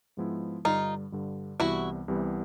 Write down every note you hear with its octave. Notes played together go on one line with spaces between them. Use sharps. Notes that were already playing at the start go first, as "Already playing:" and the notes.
G#2 F3 G#3 B3 E4
G2 D3 G3 D#4 F4
G2 D3 G3
C2 C3 E3 G3 B3 E4 F#4
C2 C3 E3 G3 B3